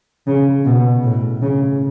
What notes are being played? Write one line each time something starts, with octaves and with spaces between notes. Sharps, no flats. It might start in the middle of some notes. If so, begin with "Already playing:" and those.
C#3
B2
A2
C#3